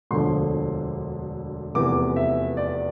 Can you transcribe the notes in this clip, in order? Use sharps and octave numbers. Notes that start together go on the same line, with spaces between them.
E1 D2 D3 F3 C6
F1 E2 C3 E3 D6
E5
D5